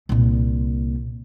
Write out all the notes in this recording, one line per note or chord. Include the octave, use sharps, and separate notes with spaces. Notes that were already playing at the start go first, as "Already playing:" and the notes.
C2 A#2